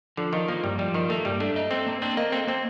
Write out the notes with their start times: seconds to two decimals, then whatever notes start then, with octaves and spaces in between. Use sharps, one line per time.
0.17 D3 F3
0.33 D#3 F4
0.48 F3 A#3
0.64 G2 G3
0.79 F3 G3
0.94 D#3 F4
1.10 A3 A#3
1.25 G2 G3
1.40 A3 D4
1.56 D#5
1.71 C4 A4
1.86 A#3
2.02 C4 D4
2.17 A#3 D#5
2.32 C4 A4
2.47 A#3 C4